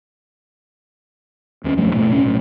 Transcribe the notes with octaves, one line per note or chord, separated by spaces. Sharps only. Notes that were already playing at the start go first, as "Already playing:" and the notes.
D#2 B3 C#4
E1 G2 F3 A3
G#2 B2 A3
F#1 A2 C#4
B1 A2